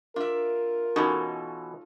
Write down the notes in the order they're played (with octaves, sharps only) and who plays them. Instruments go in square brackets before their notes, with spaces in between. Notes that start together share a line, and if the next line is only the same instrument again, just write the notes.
[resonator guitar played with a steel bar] D4 E5 [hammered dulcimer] F4 [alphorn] A#4
[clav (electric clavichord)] B2 E3 [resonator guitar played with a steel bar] C#4 D#4 A4